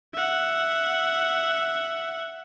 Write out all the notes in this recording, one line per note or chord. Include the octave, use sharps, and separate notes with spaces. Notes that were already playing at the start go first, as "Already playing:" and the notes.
E5 F#5